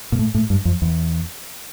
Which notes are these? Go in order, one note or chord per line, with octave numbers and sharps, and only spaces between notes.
A#2
A2
A2
G2
F2
E2